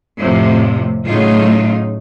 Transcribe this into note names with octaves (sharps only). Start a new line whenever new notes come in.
F2 A2 C3 F3
A2 C#3 F#3 A3 D#4 F4